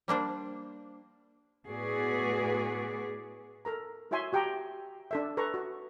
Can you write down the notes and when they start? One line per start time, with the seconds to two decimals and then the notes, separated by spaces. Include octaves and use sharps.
0.08 G3 A#3 D4 C5
1.67 A2 B3 F#4 G#4 B4 D5
3.65 A4 A#4 A#5
4.11 E4 F#4 C#5 E5 G#5 C6
4.33 F#4 G4 G5 A5 A#5
5.11 D4 A4 E5
5.37 A4 B4 A#5 C#6
5.54 F#4